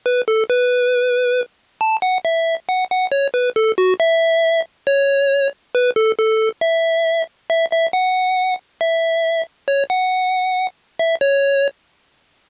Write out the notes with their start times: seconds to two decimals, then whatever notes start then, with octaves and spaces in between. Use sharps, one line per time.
0.06 B4
0.28 A4
0.50 B4
1.81 A5
2.02 F#5
2.25 E5
2.69 F#5
2.91 F#5
3.12 C#5
3.34 B4
3.56 A4
3.78 F#4
4.00 E5
4.87 C#5
5.75 B4
5.96 A4
6.19 A4
6.61 E5
7.50 E5
7.71 E5
7.93 F#5
8.81 E5
9.68 C#5
9.90 F#5
10.99 E5
11.21 C#5